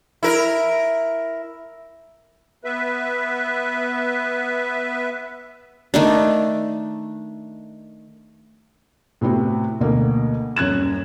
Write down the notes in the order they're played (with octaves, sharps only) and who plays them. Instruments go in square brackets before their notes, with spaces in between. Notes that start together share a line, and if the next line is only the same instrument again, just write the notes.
[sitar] E4 A#4
[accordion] B3 B4 E5
[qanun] D#3 A3 D4
[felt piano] A2 C3 B3 C4 F#4
D2 B2 A#3
D#1 F#2 F#6 G#6 E7